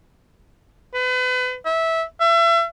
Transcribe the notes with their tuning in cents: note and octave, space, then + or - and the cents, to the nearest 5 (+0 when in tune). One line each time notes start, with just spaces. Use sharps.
B4 +35
E5 -15
E5 +35